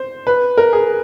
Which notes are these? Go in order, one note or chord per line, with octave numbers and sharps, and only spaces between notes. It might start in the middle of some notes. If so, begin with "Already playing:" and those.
Already playing: C5
B4
A#4
G#4